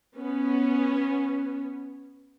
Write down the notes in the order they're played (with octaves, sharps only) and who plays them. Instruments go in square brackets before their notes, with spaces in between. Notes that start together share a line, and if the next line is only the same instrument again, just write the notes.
[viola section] B3 C#4